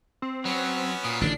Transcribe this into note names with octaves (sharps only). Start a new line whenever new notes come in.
C4
F#3 B3 C#4 F#4
A#2 D#6
A1 D3 D#3 D4 C7